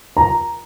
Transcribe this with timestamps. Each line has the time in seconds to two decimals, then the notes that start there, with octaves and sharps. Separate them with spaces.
0.17 A#5